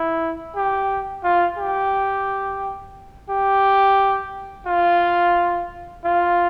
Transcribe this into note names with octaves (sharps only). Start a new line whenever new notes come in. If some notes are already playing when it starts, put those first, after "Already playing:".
Already playing: E4
G4
F4
G4
G4
F4
F4